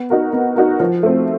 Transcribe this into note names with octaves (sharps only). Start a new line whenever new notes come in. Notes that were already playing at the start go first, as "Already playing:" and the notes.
Already playing: B3
D#4 F#4 A#4
B3
D#4 F#4 A#4
F3
A3 C4